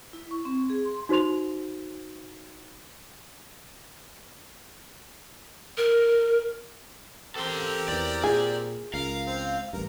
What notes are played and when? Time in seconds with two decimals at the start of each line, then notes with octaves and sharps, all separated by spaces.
0.13 E4
0.31 C#6
0.45 C4
0.70 G#4
0.85 C6
1.09 D#4 F#4 C5 C6 F7
5.78 A#4
7.36 C4 G4 A4 A#4 C6
7.88 E2 E3 D5
8.24 A#2 G#4
8.94 C#2 A#4 F5
9.27 C4
9.73 A1 G2 A#4